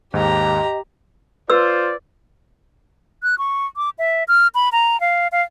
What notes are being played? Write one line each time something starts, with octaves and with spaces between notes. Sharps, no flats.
D#2 G#2 G4 D#5 A#5
F4 B4 C5 D5 E6
F#6
C#6
D6
E5
F6
B5
A#5
F5
F5